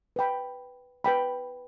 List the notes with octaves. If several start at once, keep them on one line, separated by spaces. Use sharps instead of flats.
B4 G5 B5
B4 G5 B5